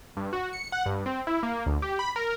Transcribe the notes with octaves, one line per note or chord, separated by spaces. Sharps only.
G2
F#4
C#7
F#5
G2
C4
E4
A#3
D2
G4
B5
A#4